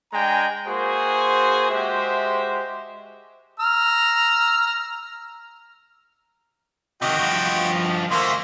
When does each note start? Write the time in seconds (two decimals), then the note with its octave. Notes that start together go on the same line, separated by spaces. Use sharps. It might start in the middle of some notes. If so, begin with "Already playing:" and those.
0.13 G#3 D4 G5 G#5 A#5
0.67 A#3 F#4 G#4 C5
1.70 G#3 F#4 G4 C5 E5
3.60 A#5 E6 F6
7.02 C3 D#3 F#4 D#5 G5
7.19 G2 F3
8.11 D2 A3 A#3 C5 C6